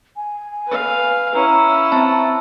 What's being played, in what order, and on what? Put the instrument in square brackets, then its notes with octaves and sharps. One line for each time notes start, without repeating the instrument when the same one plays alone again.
[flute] G#5
[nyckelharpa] B4 F5
[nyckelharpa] C#4 E4 [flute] A#5
[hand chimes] C4 E5 A5